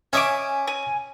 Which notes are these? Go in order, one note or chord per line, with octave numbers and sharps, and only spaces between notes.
C#4 D#5 E5 G#5 D6
G#5